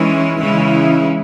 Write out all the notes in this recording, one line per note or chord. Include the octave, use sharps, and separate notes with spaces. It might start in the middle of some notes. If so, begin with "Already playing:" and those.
Already playing: E3 G#3 C#4 E4
C#3 E3 G#3 C#4 E4